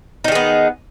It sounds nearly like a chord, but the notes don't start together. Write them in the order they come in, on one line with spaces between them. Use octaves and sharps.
D#4 D#3 G#4 B3